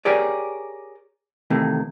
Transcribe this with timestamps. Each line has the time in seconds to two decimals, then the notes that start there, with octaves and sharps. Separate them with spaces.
0.05 G4 G#4 A#4 C#5 D5
1.50 C3 D#3 E3 A3 A#3